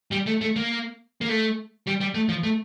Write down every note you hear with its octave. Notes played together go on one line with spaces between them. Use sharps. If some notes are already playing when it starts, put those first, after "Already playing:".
G3
A3
A3
A#3
A#3
A3
G3
G3
A3
F3
A3